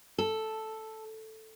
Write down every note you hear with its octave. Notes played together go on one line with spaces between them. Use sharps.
A4